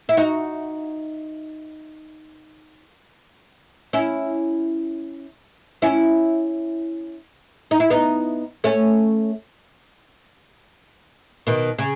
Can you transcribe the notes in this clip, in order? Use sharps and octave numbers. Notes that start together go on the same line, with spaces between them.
E4
D#4 F#4
C#4 E4
C#4 E4
D#4
E4
B3 D#4
A3 C#4
B2 D#3
C#3